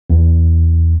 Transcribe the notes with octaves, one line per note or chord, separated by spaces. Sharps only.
E2